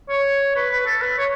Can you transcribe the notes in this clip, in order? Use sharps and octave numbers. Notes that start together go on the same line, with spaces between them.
C#5
B4
B4
A4
B4
C#5